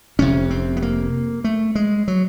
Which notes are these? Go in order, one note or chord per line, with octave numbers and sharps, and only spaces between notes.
F1 F2 C3 C#4
C4
B3
A#3
A3
G#3
F#3